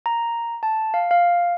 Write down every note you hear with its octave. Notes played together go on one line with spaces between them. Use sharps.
A#5
A5
F5
F5